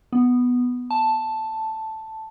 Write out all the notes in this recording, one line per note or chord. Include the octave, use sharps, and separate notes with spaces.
B3
A5